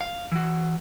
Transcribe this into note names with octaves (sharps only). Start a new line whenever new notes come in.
F5
E3 F#4